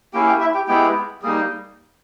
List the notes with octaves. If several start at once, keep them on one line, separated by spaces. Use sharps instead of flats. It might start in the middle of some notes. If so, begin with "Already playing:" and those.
A#3 C#4 E4 G4 G5
G4 G5
E4 E5
G4 G5
G#3 B3 E4 G4 G5
G3 A#3 D#4 G#4